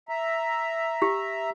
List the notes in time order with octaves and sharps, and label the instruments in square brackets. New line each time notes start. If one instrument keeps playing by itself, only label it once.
[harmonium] E5 A#5
[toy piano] G4